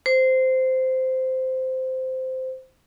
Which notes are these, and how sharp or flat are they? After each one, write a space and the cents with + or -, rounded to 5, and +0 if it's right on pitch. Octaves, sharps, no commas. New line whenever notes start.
C5 -10